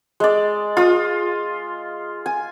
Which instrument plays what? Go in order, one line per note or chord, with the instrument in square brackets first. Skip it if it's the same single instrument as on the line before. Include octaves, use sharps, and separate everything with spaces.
[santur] G#3 D5
F4 D#6
G#5